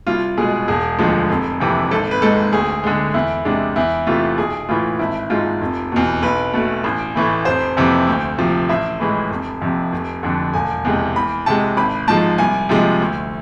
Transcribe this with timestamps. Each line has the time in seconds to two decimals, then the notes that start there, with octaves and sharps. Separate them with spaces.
0.07 C2 F4
0.38 B2 G#3 G#4
0.68 E1 G#4
0.99 D2 D3 F3 G#3
1.30 F1
1.60 F2 C3 E3
1.91 G#1 A4
2.11 B4
2.22 G#2 G#3 A4
2.53 D2 G#4
2.84 D3 G#3
3.14 E2 E4
3.45 C3 G#3 D4
3.76 E2 E4
4.07 C3 E3 A3 F4
4.38 B1 G#4
4.68 A2 E3 F4
4.99 G#1 E4
5.30 G#2 G#3 F4
5.61 F1
5.92 E2 B2
6.22 B1 B4
6.53 B2 A3
6.84 A1
7.15 A2 E3 A3
7.45 F1 C5
7.77 F2 C3 E3
8.07 D2
8.38 C3 F3
8.69 A1 E5
9.00 A2 E3 G#3
9.30 F1
9.62 F2 C3
9.92 F1
10.23 F2 D3
10.53 E1 G#5
10.85 E2 C3 G#3
11.16 E2 B5
11.46 C3 G#3 A5
11.77 G#1 B5
12.08 G#2 F3 G#3 A5
12.38 C2 G#5
12.69 C3 F3 G#3
13.01 D2